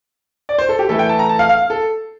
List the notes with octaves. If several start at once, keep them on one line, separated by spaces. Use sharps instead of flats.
D5
C5
A4
G4
E3 A3 E4 A4
G5
A5
A#5
A5
F5
F5
A4